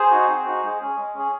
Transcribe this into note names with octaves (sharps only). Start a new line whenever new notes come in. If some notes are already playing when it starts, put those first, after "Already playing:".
Already playing: G#4 C5
D#4 F#4
C4
D#4 F#4
G#3
C#4 G#4
G#3
C#4 G#4